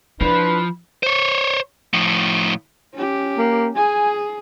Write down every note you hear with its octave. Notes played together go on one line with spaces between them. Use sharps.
F3 D4 E4 B4 B5
C5 C#5
A2 F3
C#4 G4
A#3
G#4 G#5